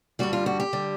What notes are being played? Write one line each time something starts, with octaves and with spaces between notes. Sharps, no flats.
G2 D3 G3 F#4
F4
F#4
G4
D3 G3